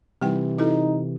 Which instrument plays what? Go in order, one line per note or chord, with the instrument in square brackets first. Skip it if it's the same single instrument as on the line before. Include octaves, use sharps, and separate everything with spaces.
[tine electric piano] C3 E3 [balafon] G3 D#4 G5
[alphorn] D#4 [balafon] E4 F#4 A4